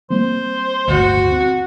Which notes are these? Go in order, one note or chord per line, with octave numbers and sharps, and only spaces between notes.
G3 A#3 C4 C5
D1 G1 D2 F#4
C4